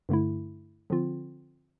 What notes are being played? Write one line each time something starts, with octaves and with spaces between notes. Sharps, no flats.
G2 D3 A3 E4
D3 F3 C4 F4